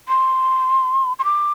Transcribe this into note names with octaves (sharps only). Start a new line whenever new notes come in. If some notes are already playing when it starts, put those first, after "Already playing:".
C6
C6
D6